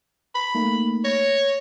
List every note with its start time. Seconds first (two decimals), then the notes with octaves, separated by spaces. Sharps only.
0.35 B5
0.54 A3 A#3 D#4
1.04 C#5 A#6